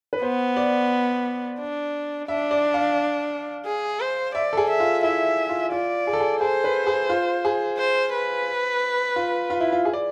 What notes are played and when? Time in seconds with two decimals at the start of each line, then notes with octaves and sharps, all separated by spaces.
0.13 B4
0.22 B3 C5
0.57 D5
1.60 D4
2.28 D4 E5
2.51 D5
2.74 F5
3.66 G#4
4.00 C5
4.35 D5 E5
4.53 A4
4.57 G#4
4.69 E5
4.80 F4
5.03 E4 E5
5.49 F4
5.72 F4 D5
6.07 G#4
6.13 A4
6.20 G#4
6.41 G#4 C5
6.64 B4
6.87 G#4
7.09 F4
7.45 G#4
7.78 C5
8.13 B4
9.16 F4
9.50 F4
9.61 E4
9.72 F4
9.85 G#4
9.93 D5